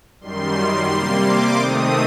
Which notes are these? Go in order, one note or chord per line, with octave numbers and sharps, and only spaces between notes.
F#2 D#3 G3 C6
C3 G3 A#3
D6
C3 D#3 A3 C4 D#6